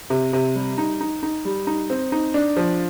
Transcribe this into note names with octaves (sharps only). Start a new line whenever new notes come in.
C3
C3
G3
D#4
D#4
D#4
G3
D#4
C4
D#4
D4
F3